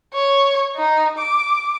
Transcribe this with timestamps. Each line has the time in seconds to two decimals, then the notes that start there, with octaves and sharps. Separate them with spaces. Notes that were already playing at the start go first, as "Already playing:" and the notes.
0.14 C#5
0.77 D#4
1.19 D6